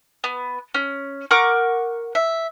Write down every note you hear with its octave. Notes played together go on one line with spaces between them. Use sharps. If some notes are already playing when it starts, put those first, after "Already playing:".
B3
C#4
A#4 F#5 C#6 D6
E5